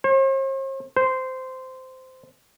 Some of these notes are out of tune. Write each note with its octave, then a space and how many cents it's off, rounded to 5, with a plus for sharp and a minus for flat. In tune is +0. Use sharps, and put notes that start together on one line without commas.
C5 +45
C5 -15